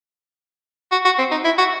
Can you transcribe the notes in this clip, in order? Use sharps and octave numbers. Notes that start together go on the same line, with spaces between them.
F#4
F#4
C4
D#4
E4
F#4